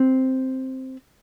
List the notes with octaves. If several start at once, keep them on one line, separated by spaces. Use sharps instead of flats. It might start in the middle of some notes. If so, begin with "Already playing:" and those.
Already playing: C4